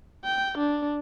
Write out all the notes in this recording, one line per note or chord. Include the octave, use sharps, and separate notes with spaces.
G5
D4